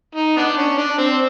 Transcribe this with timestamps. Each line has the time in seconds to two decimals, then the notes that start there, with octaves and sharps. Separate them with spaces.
0.15 D#4
0.37 B3 D4
0.57 C#4
0.78 D4
0.98 C4